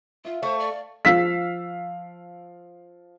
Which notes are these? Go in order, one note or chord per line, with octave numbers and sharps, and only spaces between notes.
F4 E5 F5
A3 C5 C#6
D5
F3 F5 E6 B6